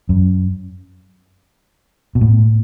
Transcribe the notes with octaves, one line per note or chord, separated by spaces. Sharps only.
F#2
B2
A2